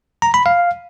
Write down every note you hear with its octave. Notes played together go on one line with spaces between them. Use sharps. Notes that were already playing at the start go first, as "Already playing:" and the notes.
A#5
B5
F5